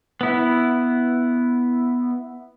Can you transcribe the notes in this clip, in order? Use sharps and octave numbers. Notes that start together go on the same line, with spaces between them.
B3 E4